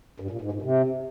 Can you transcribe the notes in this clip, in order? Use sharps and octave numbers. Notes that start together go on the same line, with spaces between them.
G2
A#2
G#2
G#2
C3